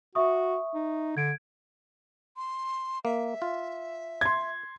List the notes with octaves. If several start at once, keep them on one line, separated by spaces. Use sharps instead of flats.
F#4 E5 C#6 D#6
D#4
D3 G#6 D7
C6
A#3 E5
F4
C6 G#6